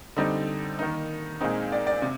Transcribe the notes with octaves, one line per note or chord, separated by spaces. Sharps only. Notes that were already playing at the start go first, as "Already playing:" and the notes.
D3 G3 C4 D#4
D#3 A#3 D#4
A#2 G#3 C4 D#4
D5
D5
C3